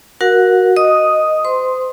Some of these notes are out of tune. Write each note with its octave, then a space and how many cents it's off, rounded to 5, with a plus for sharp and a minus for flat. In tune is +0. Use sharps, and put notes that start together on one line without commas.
F#4 +0 A#4 +10 F#5 -35
D#5 +0 D#6 +0
C5 -30 C6 +0